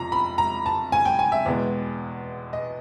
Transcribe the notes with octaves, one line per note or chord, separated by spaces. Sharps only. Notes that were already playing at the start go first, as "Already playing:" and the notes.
Already playing: F2 C3 F3 A#5
B5
A#5
A5
G#5
G5
G#5
E5
E2 B2 G#3 B3
D#5